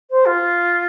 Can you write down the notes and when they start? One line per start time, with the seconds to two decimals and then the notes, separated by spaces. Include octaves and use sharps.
0.10 C5
0.25 F4